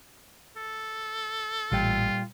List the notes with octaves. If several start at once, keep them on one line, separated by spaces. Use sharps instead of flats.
A4
A1 A#2 G3 F4 G5